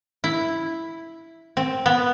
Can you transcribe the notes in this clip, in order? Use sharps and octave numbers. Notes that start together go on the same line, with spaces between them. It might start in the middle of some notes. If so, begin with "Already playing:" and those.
E4
C4
B3